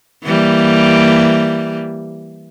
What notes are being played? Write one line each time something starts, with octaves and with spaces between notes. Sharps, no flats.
E3 G3 A#3